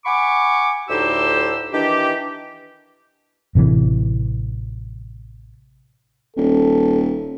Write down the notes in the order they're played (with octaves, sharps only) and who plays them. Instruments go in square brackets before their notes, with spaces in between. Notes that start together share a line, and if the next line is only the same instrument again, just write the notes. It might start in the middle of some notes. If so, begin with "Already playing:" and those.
[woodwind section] F#5 G#5 B5 C#6 D6
D2 A2 D#4 G4 C5 E6
D#3 E3 D4 G4
[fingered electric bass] A1 C3 D#3 E3
[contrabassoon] D#1 [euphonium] A4